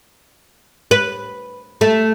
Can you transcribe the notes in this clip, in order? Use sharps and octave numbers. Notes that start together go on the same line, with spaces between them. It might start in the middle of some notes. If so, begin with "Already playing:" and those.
B4
A3